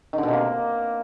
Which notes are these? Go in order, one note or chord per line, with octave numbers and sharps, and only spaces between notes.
D#3
D3
B2
C3
A#3